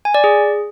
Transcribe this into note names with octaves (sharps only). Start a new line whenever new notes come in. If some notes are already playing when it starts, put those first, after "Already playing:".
G#5
D5
G#4